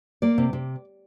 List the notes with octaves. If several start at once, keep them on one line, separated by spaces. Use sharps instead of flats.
A#3 D5
C3
C3